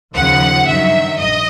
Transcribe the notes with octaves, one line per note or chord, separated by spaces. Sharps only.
D#2 C#3 F3 F#5
G2 D#3 F#3 E5
A#1 D#5